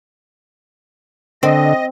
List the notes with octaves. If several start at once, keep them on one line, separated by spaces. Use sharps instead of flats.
D3 C4 D#5